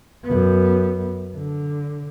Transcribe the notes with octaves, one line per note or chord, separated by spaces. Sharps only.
F#2 B3
D3